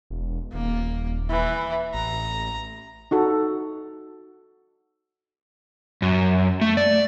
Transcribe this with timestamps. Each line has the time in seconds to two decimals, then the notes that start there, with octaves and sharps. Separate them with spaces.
0.11 E1
0.54 D#1 A#3
1.30 E3
1.94 A1 A#5
3.11 D#4 F#4 A4
6.02 F#2
6.61 A3
6.77 D5